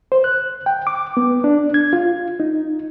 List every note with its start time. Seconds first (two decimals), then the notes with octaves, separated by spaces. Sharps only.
0.12 C5
0.24 F#6
0.66 G5
0.87 D6
1.17 B3
1.44 D4
1.74 G#6
1.93 F4
2.40 D#4